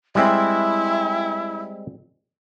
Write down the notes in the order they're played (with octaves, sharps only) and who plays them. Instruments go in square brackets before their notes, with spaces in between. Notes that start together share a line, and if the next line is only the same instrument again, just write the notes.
[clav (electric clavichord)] G3 G#3 C4 [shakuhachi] E4